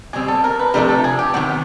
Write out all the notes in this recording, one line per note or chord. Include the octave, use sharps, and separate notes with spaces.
B2 G3 C4 G#4
A4
A#4
B4
C3 F3 A3 D4 G4 A#4
A4
G#4
G4
C3 D#3 F#3 B3 F#4